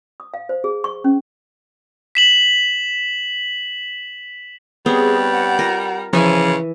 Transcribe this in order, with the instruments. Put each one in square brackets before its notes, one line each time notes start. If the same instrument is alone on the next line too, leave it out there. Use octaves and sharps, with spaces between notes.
[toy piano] D#6
F5
C5
G#4
C#6
C#4
[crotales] B6 E7 F#7
[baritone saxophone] G3 [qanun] B3 C4 C#5 [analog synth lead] G#4
[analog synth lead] F#5
[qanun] F4 A#4
[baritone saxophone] C#3 [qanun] E3 E5 G#5 [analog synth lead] F3